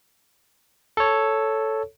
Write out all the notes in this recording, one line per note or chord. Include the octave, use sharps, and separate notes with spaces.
A4 C#5